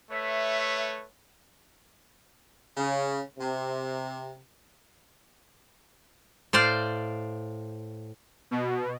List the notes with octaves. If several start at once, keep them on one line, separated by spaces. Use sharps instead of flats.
A3 B4 C#5 E5
C#3
C3
A2 C5 D5 F5
B2